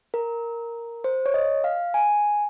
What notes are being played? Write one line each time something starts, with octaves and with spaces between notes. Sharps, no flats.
A#4
C5
C#5
D#5
F5
G#5